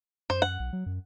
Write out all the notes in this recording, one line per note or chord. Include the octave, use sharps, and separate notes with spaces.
F#2 C5
F#5
B1
F#3
F#2